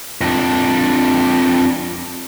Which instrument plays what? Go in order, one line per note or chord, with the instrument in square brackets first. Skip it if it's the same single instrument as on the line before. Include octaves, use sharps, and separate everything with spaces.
[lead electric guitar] F2 D4